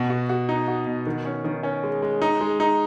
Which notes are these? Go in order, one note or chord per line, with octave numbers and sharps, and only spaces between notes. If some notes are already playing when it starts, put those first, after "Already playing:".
Already playing: B2
F#4
F#4
D#4
F#4
B2
D#3
C#4
D#3
C#4
G#3
G#3
D#4
G#3
D#4